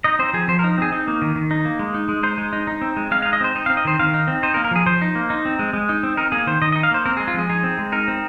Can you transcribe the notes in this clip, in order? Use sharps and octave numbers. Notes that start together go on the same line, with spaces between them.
D#4 D#5
C4 C5
F3 G#4
F3 C5
A#4
D#4
C4 G#4
D#4
A#3
D#3
D#3
D#4
A#3
G#3
D#4
G#3
D#4 C5
G#3
D#4
D#4
C4
G#3
G#3 F5
F5
D#4
D#5
C4 C5
D#4
F5
C4
D#5
D#3 C5
D#3 F5
D#4
C4
D#4 C5
A#3 A#4
A#4
F3 G#4
F3 C5
D#4
A#3
D#4
C4
G#3
G#3
D#4
C4
D#4 A#4
A#3 G#4
D#3 C5
D#3 D#5
D#5
D#4
F5
A#3 C5
C4 A#4
G#4
G#3
F4
F3 G#4
D#4 G#4
C4
G#3
D#4 A#4
C4